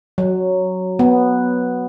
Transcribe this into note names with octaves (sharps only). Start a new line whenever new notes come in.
F#3
B3